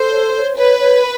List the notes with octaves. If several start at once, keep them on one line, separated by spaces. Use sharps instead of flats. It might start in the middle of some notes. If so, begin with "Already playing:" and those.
Already playing: A4 C5
C#5
C#5
B4 C#5
C#5